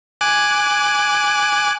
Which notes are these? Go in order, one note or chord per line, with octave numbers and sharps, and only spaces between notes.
G#5 D6 F#6